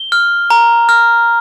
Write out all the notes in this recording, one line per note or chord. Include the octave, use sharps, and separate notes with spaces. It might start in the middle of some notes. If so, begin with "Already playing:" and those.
Already playing: G7
F6
A#5
F6